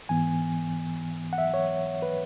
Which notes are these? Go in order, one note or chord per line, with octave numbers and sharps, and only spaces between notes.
G#2 E3 B3 G#5
F#5
E5
C#5
B4